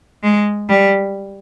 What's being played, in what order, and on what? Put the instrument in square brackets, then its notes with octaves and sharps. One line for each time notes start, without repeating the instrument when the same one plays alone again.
[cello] G#3
G3